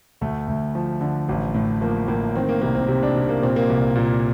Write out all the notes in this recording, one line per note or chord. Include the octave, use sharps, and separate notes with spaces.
D2 A3
D2
F3
D3
A1
A2
F3 A#3
A2 A#3
D#3 C4
A#3
C2 A#3
C4
C3 C4
D4
C3
A#3
A#2 C4
A#3
C2
A#2